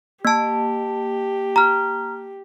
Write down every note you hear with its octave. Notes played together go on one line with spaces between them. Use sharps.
A#3 G4 A5
A#5 F6